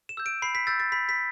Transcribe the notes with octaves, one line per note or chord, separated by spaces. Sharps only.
E7
E6 G6
D7
B5 C7
B6
E6 G6 A6
A6
B5 B6
B6